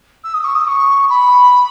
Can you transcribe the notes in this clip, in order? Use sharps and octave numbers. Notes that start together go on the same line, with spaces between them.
E6
D#6
C#6
D#6
C#6
B5